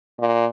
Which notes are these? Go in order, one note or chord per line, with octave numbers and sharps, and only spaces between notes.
A#2